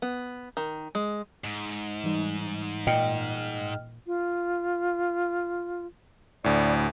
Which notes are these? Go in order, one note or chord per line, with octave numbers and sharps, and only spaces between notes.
B3
D#3
G#3
G#2
E3 G3 D#4
A#2 D#5 G5 F6
F4
D2 A2 D5